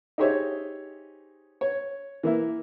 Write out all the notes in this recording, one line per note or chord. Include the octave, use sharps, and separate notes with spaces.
D#4 G4 G#4 C5 C#5 E5
C#5
E3 A#3 E4